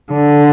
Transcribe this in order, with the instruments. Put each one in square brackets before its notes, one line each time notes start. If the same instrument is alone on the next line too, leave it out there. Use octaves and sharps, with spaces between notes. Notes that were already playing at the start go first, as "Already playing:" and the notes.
[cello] D3